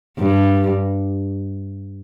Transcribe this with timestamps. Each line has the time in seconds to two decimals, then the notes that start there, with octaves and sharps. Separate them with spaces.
0.19 G2